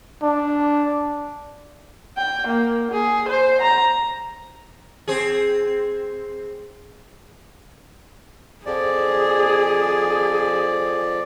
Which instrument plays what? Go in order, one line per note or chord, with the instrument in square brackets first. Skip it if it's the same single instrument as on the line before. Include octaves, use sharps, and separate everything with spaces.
[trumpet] D4
[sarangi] G5
A#3
G#4
C5
A#5
[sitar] C4 G#4
[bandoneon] F2 F3 D5 [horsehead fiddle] G#4